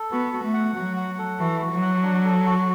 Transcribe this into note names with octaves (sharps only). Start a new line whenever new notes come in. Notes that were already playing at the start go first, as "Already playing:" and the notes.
Already playing: A4
B3 F#4
F#4
A3
F#5
F#3 F#4
F#5
A4
E3 F#4
F#4
F#3
F#5
D4
A4
F#4